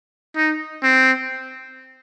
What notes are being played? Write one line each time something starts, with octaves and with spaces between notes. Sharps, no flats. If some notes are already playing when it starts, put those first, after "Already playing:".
D#4
C4